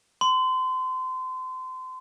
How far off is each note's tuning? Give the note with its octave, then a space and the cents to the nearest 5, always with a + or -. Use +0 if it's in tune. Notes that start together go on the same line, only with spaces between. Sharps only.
C6 -30